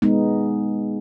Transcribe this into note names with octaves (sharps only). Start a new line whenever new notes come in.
G#3 B3 D#4